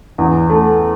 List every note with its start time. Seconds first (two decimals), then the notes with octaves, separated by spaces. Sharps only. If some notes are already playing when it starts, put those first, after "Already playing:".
0.18 E2
0.49 A3